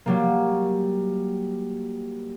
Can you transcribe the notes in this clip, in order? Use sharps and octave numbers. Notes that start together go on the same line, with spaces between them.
F#3 G3 A#3